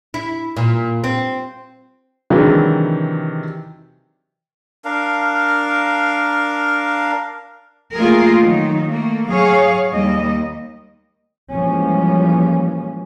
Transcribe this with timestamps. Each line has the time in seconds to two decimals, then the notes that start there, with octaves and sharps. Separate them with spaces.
0.14 E4
0.57 A#2
1.04 C4
2.30 C3 D#3 E3 F#3 G#3 D4
4.85 D4 A#4 F5
7.96 A3 A#3 F4 G#4 A#4
8.41 D#3 F#3 D#4
8.88 A3 A#3
9.30 F#3 G#4 C#5 F5
9.91 D#2 G3 A#3 D#5
11.52 E3 F3 G3 G#3 A#3 C#4